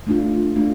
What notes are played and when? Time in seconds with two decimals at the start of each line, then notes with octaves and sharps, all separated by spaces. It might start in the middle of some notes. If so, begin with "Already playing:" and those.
0.07 A3 D4 F4
0.56 A3 D4 F4